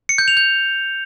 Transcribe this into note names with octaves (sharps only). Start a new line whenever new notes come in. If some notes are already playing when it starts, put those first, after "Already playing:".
C#7
G6
F7
G6